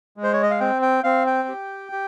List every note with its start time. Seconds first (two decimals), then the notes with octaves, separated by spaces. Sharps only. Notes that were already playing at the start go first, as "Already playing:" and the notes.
0.17 G#3
0.23 C5
0.33 C#5
0.43 D#5
0.51 F5
0.60 C4 G5
0.82 G5
1.04 C4 F5
1.26 G5
1.48 G4
1.92 G4